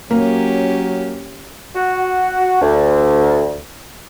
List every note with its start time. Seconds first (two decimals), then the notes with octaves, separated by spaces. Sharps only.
0.11 F#3 A#3 C#4 G4
1.75 F#4
2.61 D2